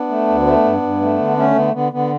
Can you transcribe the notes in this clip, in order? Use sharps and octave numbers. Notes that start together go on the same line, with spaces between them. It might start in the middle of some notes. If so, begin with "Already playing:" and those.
Already playing: B3 D4
A3
D2
A3
G2
G2
A3
D3
A3 C#4
D3 B3
D3 B3
D3 B3